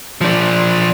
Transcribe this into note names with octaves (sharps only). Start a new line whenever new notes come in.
F3 D4